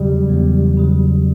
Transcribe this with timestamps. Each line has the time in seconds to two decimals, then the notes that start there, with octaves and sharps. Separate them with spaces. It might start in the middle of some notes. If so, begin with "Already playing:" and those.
Already playing: E2 C#3 F#3 G3
0.29 E2
0.77 C#3 F#3